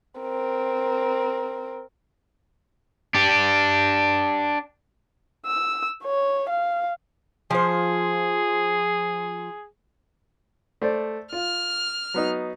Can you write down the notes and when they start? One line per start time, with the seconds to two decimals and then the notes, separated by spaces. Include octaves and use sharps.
0.21 C4 A#4
3.14 D4 G4
5.46 E6
6.04 C#5
6.49 F5
7.51 F3 G#4 C5
10.82 A3 C5 D5
11.33 F4 F6
12.14 F#3 B3 D#4